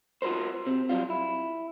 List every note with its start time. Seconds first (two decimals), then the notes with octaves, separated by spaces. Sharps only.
0.22 F4 F#4 G#4 A#4 C5
0.66 C3 C4
0.89 F#3 G3 F4
1.10 E4